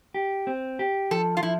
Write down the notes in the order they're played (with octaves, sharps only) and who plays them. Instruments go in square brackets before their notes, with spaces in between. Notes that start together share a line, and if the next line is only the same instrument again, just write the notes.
[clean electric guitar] G4
C4
G4
[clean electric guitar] F3 [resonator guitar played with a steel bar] A4
[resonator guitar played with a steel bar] F4
[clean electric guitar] F3 [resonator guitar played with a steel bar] E4